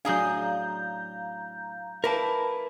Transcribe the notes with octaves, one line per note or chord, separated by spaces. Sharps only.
A2 F#3 D4 G#4 F5 G#5 A#5 G6
A#3 E4 A#4 B4 A5